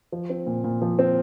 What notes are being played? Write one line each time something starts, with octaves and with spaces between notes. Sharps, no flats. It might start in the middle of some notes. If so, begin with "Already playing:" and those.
F3
C4
A#2
A#2
F3
C4